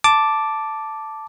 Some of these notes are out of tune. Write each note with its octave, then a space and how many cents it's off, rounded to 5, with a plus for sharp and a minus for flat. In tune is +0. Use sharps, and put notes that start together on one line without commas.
A5 +0 D6 +0